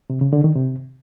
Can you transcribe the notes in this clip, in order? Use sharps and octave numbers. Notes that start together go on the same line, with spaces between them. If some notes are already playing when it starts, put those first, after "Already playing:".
C3
C#3
D3
D#3
C3